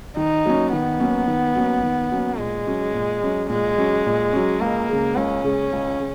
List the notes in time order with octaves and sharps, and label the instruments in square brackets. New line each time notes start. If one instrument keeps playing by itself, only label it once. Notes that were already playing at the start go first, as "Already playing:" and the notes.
[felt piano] D#3 [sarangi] D#4
[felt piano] F#3 A#3 C#4
[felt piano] D#3 [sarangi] B3
[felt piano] F#3 A#3 C#4
D#3
F#3 A#3 C#4
D#3
F#3 A#3 C#4
[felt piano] A#2 [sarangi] G#3
[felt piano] F#3 C#4
A#2
F#3 C#4
[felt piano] A#2 [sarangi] G#3
[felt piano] F#3 C#4
A#2
F#3 C#4
[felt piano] C#2 [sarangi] A#3
[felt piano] C#3 G#3
[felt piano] C#2 [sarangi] C#4
[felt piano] C#3 G#3
C#2
C#3